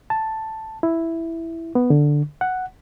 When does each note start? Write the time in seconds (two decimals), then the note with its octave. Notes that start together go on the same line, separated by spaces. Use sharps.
0.10 A5
0.83 E4
1.75 B3
1.90 D3
2.41 F#5